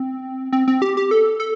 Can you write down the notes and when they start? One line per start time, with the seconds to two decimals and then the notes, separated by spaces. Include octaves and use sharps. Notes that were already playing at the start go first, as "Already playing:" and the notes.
Already playing: C4
0.53 C4
0.68 C4
0.82 G4
0.97 G4
1.11 A4
1.40 A4